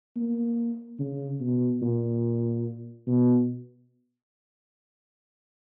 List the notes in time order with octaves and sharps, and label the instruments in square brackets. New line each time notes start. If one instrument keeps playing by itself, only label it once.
[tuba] A#3
C#3
B2
A#2
B2